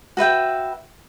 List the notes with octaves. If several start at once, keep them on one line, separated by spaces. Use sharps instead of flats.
F#4 B4 E5 G5